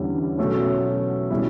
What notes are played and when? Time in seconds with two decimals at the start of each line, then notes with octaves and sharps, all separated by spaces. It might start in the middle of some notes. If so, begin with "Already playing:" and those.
Already playing: E2 D3 G3 C#4 E4
0.38 B2 F#3 A3 C#4
1.30 B2 G3 C#4 E4